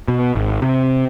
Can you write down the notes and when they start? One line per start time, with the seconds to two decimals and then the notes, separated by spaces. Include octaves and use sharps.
0.08 B2
0.35 G#1
0.62 C3